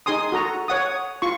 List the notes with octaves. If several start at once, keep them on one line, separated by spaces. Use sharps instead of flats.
D#4 G#4 G#5 C6 D#6
F#4 A4 A#5
C#5 F#5 D#6
F4 C#6